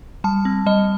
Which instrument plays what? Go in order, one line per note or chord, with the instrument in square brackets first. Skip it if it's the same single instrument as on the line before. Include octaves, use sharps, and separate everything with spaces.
[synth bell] G3 A5
C4
G3 D#5